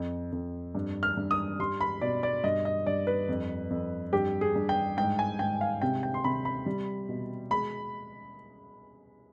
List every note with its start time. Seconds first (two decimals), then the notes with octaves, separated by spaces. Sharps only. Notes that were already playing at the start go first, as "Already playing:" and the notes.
Already playing: F2
0.32 F2
0.75 G2
1.03 F6
1.17 G2
1.31 D#6
1.59 G3 C6
1.81 B5
2.01 B2 D5
2.23 D5
2.44 G2 D#5
2.65 D#5
2.87 G2 D5
3.07 B4
3.29 F2
3.70 F2
4.13 G2 G4
4.41 G#4
4.56 G2
4.69 G5
4.97 G#2 G5
5.19 G#5
5.39 G#2 G5
5.61 F5
5.82 C3 G5
6.03 G5
6.14 C6
6.24 C3 B5
6.45 B5
6.66 G3
7.09 B2
7.51 G#3 B5